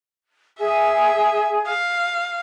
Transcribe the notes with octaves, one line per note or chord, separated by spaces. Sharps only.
G#4 E5 G#5
F5